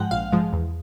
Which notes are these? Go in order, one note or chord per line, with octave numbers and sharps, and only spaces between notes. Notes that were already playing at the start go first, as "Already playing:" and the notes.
Already playing: G#2 F3 G#3 F#5 G5
A#1 F5
G#2 F3 G#3
E2